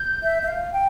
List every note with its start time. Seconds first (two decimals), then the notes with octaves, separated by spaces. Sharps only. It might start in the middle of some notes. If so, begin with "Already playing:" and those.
Already playing: G6
0.23 E5
0.42 E5
0.48 F5
0.73 G5